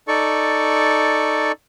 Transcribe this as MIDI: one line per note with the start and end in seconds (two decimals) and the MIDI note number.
0.08 1.52 63
0.08 1.52 69
0.08 1.52 74
0.08 1.52 85